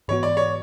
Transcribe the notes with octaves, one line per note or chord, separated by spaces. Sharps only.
G#2 E3 B3 F#4 C#5
D5
C#5